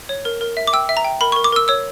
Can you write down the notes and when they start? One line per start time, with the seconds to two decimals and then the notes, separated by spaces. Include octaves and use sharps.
0.09 C#5
0.25 A#4
0.41 A#4
0.57 E5
0.67 D6
0.73 G5 E6
0.89 E5
0.97 A#5
1.04 G5
1.21 A#4 B5
1.32 A#4 C#6
1.44 D6
1.52 A#4 E6
1.68 C#5 E6